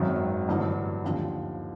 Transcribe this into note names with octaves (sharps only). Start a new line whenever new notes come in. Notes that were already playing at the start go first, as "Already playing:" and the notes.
Already playing: G#1 F#2 D#3 F#3 C4
A1 G2 D3 F#3
D#2 D3 F3